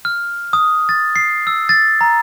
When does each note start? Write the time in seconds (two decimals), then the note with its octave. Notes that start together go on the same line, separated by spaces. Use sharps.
0.05 F6
0.53 D#6
0.89 A6
1.16 C7
1.47 E6
1.69 A6
2.01 A#5